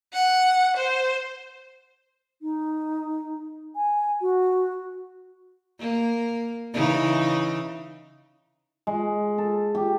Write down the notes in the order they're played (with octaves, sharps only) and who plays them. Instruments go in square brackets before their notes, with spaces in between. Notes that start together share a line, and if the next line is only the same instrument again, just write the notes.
[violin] F#5
C5
[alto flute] D#4
G#5
F#4
[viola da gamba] A#3
C#3 E3 D#4
[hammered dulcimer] G#3
A4
G4